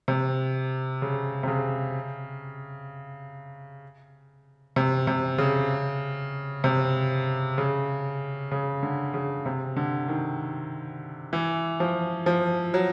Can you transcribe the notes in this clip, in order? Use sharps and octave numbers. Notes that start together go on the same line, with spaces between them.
C3
C#3
C3
C#3
C3
C3
C#3
C3
C#3
C#3
D3
C#3
C3
D3
D#3
E3
F3
F3
F#3